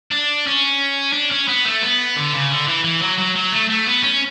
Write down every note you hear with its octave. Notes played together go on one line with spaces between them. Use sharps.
D4
C#4
D4
C#4
B3
A3
B3
D3
C#3
D3
E3
E3
F#3
F#3
F#3
A3
A3
B3
C#4